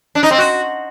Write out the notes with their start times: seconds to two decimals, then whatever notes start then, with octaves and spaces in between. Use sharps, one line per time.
0.15 D4
0.23 D#4
0.31 C4
0.38 F#4